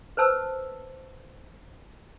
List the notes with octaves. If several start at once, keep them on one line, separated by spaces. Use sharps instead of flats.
B4 C5 A5 E6